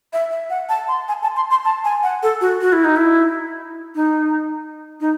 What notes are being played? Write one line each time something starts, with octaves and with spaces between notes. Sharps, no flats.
E5
E5
F#5
A5
C6
G#5
A5
C6
C6
A5
G#5
F#5
A4
F#4
F#4
E4
D#4
E4
D#4
D#4